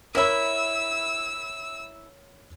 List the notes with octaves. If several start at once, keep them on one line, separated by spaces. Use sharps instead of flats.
E4 A#4 C#5 E5 B5 E6